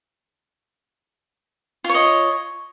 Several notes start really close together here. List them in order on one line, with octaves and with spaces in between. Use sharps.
F4 C#5 D#5